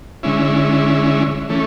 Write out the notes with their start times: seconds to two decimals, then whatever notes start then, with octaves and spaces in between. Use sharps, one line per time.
0.23 D3 G#3 C#4 E4
1.49 E3 A3 C#4